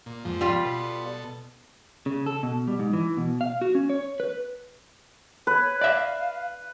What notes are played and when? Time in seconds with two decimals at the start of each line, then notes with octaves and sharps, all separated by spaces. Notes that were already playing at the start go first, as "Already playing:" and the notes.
0.06 A#2
0.25 F2 G#2 F3
0.41 G3 B3 F4
0.65 B2 A4
2.06 C#3
2.26 A4
2.43 B2
2.67 G3
2.79 G#2
2.93 E3
3.17 B2
3.41 F5
3.61 F#4
3.75 C#4
3.89 C#5
4.20 B4
5.47 B4 C#5
5.81 D5 E5 F5